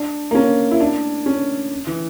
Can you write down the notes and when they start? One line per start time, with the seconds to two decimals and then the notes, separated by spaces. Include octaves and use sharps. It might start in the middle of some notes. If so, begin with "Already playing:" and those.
Already playing: D4
0.31 A#3
0.35 C#4
0.71 E4
0.81 D4
1.26 C#4
1.87 E3